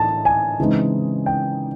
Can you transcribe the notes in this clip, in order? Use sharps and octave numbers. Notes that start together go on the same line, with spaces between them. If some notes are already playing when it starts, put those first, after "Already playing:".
Already playing: A2 E3 A5
G#5
C#3 E3 G#3 C4 D#4
G5